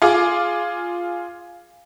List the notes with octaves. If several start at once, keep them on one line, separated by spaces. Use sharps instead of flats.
F4 G#4 D6